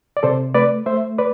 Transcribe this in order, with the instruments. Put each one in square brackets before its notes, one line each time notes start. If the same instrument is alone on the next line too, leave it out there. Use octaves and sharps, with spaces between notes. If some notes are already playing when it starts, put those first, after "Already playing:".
[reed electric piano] D5
C3 A4 C5
A3 B4 D5
A3 C5 E5
B4 D5